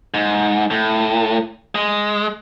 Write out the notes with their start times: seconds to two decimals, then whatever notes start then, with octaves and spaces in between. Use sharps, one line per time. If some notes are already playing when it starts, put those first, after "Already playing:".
0.14 G#2
0.71 A2
1.75 G#3